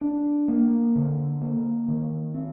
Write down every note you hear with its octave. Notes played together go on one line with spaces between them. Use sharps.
D4
A#3
D3
A#3
D#3
C4